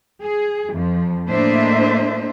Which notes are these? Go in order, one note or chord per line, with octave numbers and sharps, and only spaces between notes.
G#4
F2 F3
A2 A#3 D4 C5 D#5 E5